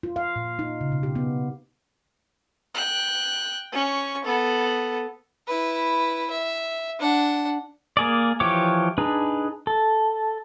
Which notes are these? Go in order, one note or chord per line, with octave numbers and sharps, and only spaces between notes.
F4
F5
A#2
D#4
C#3
B2
G4
B3
G5 F#6
C#4 C#6
B3 A4
E4 B4
E5
D4 F#5
A#3 G#4 D5
E3 F3 G4 C#5 D6
D4 D#4 G#4 B4
A4